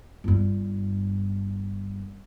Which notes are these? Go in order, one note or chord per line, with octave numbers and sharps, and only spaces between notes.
G1 G2